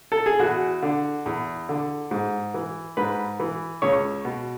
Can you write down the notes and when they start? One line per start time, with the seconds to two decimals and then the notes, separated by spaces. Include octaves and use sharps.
0.12 A4
0.26 G#4
0.39 E2 F#4
0.82 D3
1.26 E2
1.69 D3
2.11 G#2
2.54 E3
2.97 G#2 B4
3.40 E3
3.82 C#2 C#5
4.25 B2